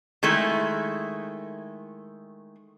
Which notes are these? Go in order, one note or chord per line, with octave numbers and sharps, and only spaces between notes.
D#3 G#3 A3 E4